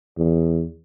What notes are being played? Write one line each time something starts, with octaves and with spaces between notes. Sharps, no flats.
E2